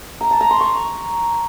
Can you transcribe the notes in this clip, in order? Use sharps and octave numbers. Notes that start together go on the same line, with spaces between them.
A#5
A5
A#5
C6
C#6